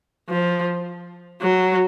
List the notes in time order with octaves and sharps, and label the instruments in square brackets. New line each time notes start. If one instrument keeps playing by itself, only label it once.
[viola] F3
F#3